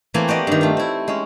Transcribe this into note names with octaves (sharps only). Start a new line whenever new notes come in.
E3 A3 A#3 C4 G#5
F#4 G4 D5 D#5
G2 D#3
A3 F4
C4 E4
G#3 C#4